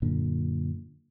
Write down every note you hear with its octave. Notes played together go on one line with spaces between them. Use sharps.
F#2 A#2 D3